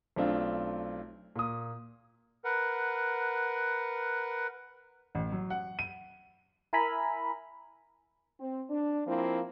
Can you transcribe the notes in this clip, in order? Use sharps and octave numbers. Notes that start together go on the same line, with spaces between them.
B1 A3 C4 D4 F4
A#2 D#6
A#4 B4 F#5
A1
F#3
F#5
D#7
E4 A#4 E5 G#5 A#5 B5
C4
D4
F3 A#3 C4 E4